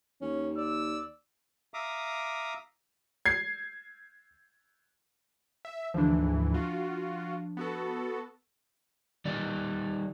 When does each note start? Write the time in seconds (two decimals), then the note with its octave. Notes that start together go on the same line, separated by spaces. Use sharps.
0.22 D#2 C#4
0.57 D5 E6
1.74 E5 F5 A#5 D6 D#6
3.26 G#6 C7
5.65 E5
5.94 D2 G#2 E3 F3 D4
6.54 F4 F#4
7.57 B3 F#4 A4
9.25 D#3 G3 D#4 D5